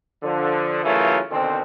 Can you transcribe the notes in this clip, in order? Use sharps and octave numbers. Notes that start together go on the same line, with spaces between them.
D3 F3
C#3 E3 F#3 A3 F4 A#4
B2 D3 D#3 C4